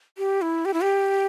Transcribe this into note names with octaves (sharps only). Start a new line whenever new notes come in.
G4
E4
G4
E4
G4